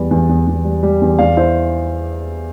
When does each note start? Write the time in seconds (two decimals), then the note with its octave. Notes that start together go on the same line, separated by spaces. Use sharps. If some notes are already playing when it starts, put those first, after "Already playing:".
Already playing: E2 G3 B4 D5
0.11 E2
0.29 E2
0.47 E2
0.65 G3
0.83 G3
1.02 E2
1.19 E2 D5 F5
1.37 E4 C5 E5